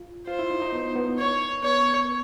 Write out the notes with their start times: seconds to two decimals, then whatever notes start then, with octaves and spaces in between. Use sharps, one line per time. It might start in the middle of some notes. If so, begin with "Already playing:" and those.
Already playing: F4
0.28 F4 C5
0.39 E4
0.51 D#4
0.62 D#4
0.72 B3
0.95 B3
1.18 C#5
1.63 B3 C#5